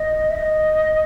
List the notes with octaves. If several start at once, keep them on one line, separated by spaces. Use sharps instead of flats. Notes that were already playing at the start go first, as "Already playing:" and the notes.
Already playing: D#5
E5
D#5